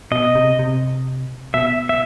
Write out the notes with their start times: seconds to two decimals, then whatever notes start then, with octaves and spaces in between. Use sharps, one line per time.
0.11 B2 D#5
0.35 C3
0.59 C3
1.54 B2 E5
1.89 E5